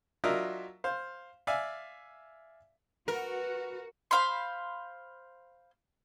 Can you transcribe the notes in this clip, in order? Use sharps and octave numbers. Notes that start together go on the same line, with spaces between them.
F#3 D4 F4 A#4 D#5 E5
C5 F5
D5 E5 F5 G#5
F#4 A#4 B4
C5 F5 B5 C6